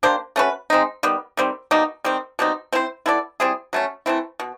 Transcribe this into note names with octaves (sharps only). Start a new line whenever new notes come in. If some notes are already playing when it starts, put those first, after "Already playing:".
A#3 D4 G4 C5
A3 C#4 F#4 B4
G#3 C4 D#4
D#3 G3 B3
D#3 G3 C4
B2 G3 A#3 D#4
D#3 G3 C4
B2 G3 C4 D#4
C4 E4 A4 C5
B3 E4 A4 D5
G3 C4 E4 G#4
F#3 A3 C#4
E3 A3 C4 E4
B2